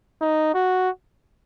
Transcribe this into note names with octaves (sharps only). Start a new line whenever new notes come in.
D#4
F#4